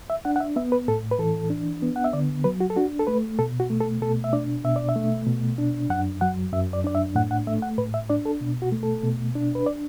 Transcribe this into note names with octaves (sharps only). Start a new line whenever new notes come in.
E5
D4 F#5
F#5
E5
B3 E5
B4
A2 A4
B4
E3 A4
D4
B3
F#5
E5
D3 D5
F#3 B4
F#4
A4
D4 F#4
A4
A3 B4
B2 A4
F#4
A3
A4
B2 A4
E5
D4 D5
B2 E5
D5
E5
A3
B2
D4
F#2 F#5
F#3 F#5
F#2 E5
D5
D4 D5
E5
A2 F#5
F#5
A3 E5
F#5
A2 B4
E5
D4 D5
A4
B2
F#4
A3
A4
B2
D4
B4
D5